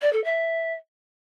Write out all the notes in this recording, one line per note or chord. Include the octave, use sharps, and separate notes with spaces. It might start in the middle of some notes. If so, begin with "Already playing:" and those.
D5
A4
E5